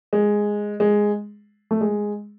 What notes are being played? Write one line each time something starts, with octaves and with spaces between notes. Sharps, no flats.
G#3
G#3
A3
G#3